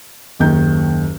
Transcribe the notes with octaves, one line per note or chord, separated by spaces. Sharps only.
F#1 D#2 D#3 G6